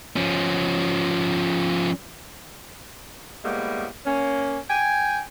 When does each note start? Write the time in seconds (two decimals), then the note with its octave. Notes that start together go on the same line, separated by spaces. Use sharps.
0.16 F3 C#4
3.44 A2 G3 G#3 A#3 B3
4.06 A#3 C#4
4.68 G5 G#5